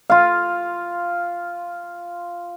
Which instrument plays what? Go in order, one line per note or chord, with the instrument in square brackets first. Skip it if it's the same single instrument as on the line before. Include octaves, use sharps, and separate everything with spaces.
[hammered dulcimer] F4 F5